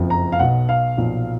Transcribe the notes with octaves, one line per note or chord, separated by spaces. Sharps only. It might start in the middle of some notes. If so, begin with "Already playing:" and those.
Already playing: F#1 F2 F3
A#5
F5
B1 B2 F#5
F5
B1 A#2 F3